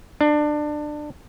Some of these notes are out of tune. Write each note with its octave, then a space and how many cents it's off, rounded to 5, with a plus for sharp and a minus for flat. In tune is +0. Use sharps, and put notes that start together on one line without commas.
D4 +25